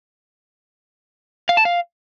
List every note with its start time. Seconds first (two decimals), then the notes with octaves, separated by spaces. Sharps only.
1.49 F5
1.57 A5
1.65 F5